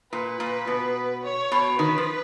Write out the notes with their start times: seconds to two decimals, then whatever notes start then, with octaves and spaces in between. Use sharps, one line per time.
0.12 A#2 B4
0.40 A#2
0.67 B2
1.23 C#5
1.52 B2
1.79 D#3 B4
1.98 F3